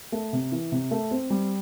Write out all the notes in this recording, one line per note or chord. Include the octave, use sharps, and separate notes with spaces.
A3
C3
E3
C3
A3
C4
G3